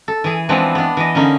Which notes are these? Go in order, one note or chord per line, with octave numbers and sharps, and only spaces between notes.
A4
E3 G#4
E3 F3 G#3 B3 C4 D4
B3 D4
E3 D#5
D3 A#3 C#4 D#4